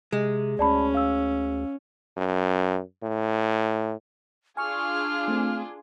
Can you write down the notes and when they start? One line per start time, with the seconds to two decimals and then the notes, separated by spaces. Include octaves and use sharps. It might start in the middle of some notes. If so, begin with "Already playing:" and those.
0.12 C3 G#3
0.59 D2 C#4 D5 A5 B5
0.94 F5 E6
2.17 F#2
3.03 A2
4.57 D4 F4 G#4 G#5 C#6 D#6 F6
5.28 A3 C4